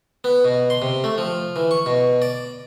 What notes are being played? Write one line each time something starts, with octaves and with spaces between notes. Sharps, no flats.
B3
B2
C6
C3
A3
F3
E3
C#6
B2
D5